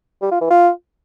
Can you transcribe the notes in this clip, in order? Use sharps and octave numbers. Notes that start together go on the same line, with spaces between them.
G3
F4
E3
F4